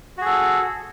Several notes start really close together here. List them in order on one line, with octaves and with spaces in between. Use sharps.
F#4 G#4 A4